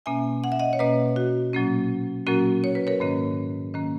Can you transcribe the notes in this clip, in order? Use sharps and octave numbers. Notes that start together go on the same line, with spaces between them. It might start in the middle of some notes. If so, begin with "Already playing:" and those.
B2 A#3 C#4 E5 G#5
F#5
E5
D#5 F#5
C#5
B2 A#3 C#4 B4 D#5
F#4
A#2 F#3 A#3 C#4
A#2 F#3 A#3 C#4 F#4 A#4
C#5
B4
A#4 C#5
G#2 D#3 A#3 C#4
D#3 A#3 C#4